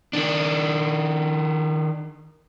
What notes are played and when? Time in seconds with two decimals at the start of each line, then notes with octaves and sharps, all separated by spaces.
0.13 D#3 D4